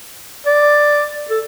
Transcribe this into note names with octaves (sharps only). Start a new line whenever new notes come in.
D5
A4